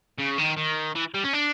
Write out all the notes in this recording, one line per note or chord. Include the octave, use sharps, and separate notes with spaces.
C#3
D#3
D#3
E3
G3
C#4
D4